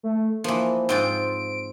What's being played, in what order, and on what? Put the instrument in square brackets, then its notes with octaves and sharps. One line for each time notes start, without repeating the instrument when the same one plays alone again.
[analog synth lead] A3
[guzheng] E3 F3 [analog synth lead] A#3
[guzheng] G#2 C4 F4 [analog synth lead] D7